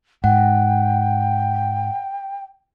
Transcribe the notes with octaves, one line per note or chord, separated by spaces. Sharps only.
G#2 F#5 G5